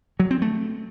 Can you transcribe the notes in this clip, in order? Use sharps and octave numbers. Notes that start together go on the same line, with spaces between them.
F#3
C4
A3